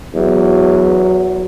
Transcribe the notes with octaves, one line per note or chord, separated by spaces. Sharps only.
E2 F#3